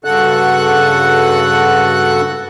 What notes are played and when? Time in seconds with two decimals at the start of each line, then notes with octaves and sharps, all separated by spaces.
0.04 G2 C#3 F#4 A4 F#5 F#6